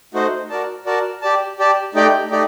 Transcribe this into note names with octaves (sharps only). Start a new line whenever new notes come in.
A3 D#4 F#4 C5
F#4 A#4 D5 A5
F#4 A#4 D5 A5
G4 D5 A5
G4 D5 A5
A3 D#4 G4 D5 G5
A3 D#4 G4 D5